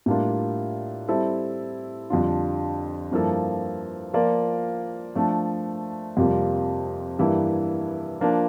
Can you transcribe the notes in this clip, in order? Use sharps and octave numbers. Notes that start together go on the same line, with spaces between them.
A2 G3 A#3 D4 F4
G3 C4 E4 A4
F2 D3 G3 D4 F4
G2 F3 A#3 E4 A4
F3 A#3 F4 A#4 D5
F3 A3 D4
F2 C3 G3 A#3 F4
G2 E3 A#3 E4 G4
F3 A#3 D4 F4